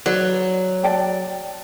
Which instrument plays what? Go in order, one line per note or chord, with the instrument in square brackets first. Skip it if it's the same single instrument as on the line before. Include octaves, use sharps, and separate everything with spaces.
[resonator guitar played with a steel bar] F#3 [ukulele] B4 C5 D5
[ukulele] D5 G5 A5